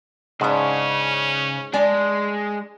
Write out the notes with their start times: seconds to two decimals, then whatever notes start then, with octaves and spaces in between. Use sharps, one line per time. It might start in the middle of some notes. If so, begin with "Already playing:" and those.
0.41 G#2 C#3 C#4 D4 B4
1.73 G#3 D4 D5 G#5